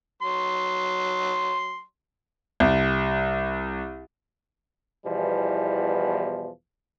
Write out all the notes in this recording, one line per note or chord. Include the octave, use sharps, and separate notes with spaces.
F#3 C6
C2
E2 B2 E3 F3 G3